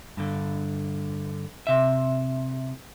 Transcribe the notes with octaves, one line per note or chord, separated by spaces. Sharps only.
G2 D3
C3 E5